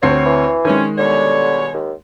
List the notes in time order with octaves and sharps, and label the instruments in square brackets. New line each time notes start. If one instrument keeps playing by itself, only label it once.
[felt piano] D2 C4 C7 [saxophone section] F#4 B4 C#5
[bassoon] E3
[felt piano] D#3 G#3 [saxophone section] C4 C#4
[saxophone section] B2 G3 C#5 [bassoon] D3
[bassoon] D#2